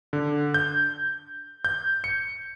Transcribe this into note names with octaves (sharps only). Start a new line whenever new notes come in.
D3
G6
G6
C#7